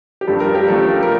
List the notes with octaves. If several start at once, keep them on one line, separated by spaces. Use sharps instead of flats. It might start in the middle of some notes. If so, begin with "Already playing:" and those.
G4
G2 F3 A3 A4
A#4
G4
G2 F3 A3 A4
A#4